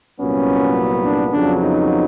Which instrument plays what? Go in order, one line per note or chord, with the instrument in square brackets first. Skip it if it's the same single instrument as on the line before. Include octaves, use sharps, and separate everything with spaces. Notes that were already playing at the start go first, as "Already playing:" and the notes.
[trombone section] C2 A#2 F#3 B3 C#4
D4
F2 C#3 F#3 B3 D4
D#4